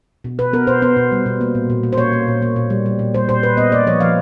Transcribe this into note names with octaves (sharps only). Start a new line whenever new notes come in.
B2
B2 B4
B3 A#4
B2 C5
B3 C5
B2
G3
B2
A#3
A#2
A#2
A#3
C5
A#3 C#5
A#3
A#2
A#3
A#2
G3
G3
A#2
G3 C5
A#2 C5
A#2 B4
B3 D#5
A#3 D5
F3 C#5
F3 F5